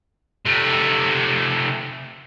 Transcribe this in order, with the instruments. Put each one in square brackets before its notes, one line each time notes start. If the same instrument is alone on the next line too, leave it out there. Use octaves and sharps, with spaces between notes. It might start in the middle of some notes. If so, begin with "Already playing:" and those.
[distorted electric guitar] C3 A3